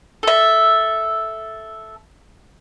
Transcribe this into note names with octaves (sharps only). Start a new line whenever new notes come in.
A4 E5